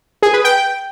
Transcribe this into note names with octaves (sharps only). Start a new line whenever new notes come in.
G#4
B4
G5